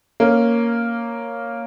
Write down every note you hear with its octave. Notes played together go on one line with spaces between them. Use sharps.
A#3 C#4